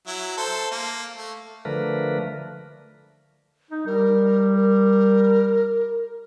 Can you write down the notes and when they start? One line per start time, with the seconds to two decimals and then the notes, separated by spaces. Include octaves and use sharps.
0.07 F#3 E4
0.38 A4 C5
0.71 A#3
1.17 A3
1.65 D3 F3 A3 A#4 B4
3.71 D#4
3.86 G3 A#4
4.56 A#4